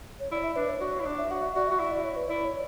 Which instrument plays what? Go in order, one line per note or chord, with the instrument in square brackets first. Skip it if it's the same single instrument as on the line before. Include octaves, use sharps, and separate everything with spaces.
[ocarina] C#5
[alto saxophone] E4 [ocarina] D5
[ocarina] E5
[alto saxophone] D4 [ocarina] B4
[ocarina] C#5
[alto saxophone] F#4 [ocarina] D5
[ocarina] C#5
[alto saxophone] E4
D4
[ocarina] E5
[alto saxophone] F#4 [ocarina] F#5
[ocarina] E5
[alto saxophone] F#4 [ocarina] D5
[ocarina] E5
[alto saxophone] F#4
[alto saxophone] E4 [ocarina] E5
[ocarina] D5
C#5
B4
[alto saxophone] E4 [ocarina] D5
[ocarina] C#5